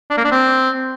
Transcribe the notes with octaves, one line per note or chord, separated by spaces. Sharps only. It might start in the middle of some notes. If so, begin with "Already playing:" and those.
D4
A#3
D4
C4